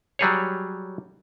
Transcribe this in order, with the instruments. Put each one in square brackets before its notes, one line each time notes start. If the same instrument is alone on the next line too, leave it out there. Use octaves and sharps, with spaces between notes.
[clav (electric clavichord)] F#3 G3 G#4 C#5